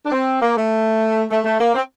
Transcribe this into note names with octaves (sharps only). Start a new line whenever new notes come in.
D4
C4
A#3
A3
A3
A3
A#3
C4